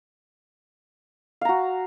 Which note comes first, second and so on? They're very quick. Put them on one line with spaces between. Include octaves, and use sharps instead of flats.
F5 A#5 F#4